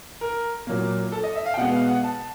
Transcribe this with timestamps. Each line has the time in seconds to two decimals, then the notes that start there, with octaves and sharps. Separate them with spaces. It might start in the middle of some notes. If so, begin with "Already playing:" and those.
0.21 A#4
0.67 A#2 F#3 A#3
1.12 A4
1.24 D#5
1.36 E5
1.46 F5
1.54 G5
1.57 B2 G#3 B3 F#5
1.73 F5
1.88 F#5
2.03 A5